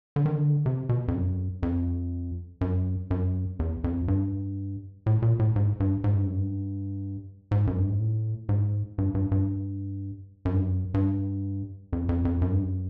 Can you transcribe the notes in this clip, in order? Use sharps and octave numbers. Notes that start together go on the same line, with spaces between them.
D3
D#3
D3
C3
B2
F2
F#2
F2
F#2
F#2
E2
F2
G2
A2
A#2
A2
G#2
G2
G#2
G2
F#2
G2
G#2
F#2
G2
G#2
A2
G#2
G2
G2
G2
F#2
G2
F#2
G2
F2
F2
F2
F#2
G2
F#2